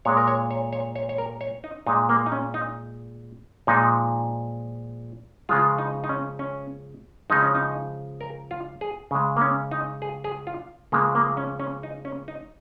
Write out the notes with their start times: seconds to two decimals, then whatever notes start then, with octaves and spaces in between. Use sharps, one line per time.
0.05 A#2 G#3 C#5
0.17 A#4
0.27 C#5
0.51 C#5
0.73 C#5
0.96 C#5
1.09 C#5
1.18 A#4
1.41 C#5
1.64 D#4
1.87 A#2 G#3 D#4
2.09 A#3
2.26 D#4
2.32 C#4
2.54 D#4
3.67 A#2 F3 G#3 D#4
5.49 C#3 F3 G#3 F4
5.78 D#4
6.04 D#4
6.09 C#4
6.39 C#4
7.30 C#3 F3 G#3 D#4
7.42 C#4
7.55 D#4
8.21 A#4
8.51 F4
8.81 G#4
9.11 C#3 G#3
9.36 A#3
9.41 C#4
9.71 D#4
10.02 G#4
10.24 G#4
10.47 F4
10.92 C#3 F3 G#3 A#3
11.15 A#3
11.37 C#4
11.60 C#4
11.83 D#4
12.05 C#4
12.28 D#4